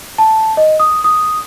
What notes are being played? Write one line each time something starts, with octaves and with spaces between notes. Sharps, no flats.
A5
D#5
D#6
D#6